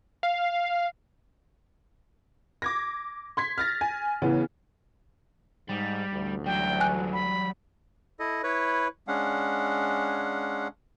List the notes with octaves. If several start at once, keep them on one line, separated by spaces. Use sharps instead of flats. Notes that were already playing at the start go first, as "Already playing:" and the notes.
F5
D6 G#6 A#6
C6 G#6 B6
F6 A6 A#6
G#5
C#3 E3 B3
G#2 G3
A1 D2
F#3 G3 G5
G#5 F#6
B5
E4 A4 D#5
E4 B4 C#5
G#3 C#4 D4 F5 F#5